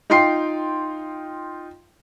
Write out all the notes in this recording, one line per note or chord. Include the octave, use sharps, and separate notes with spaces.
D#4 F4 G5 C6 C7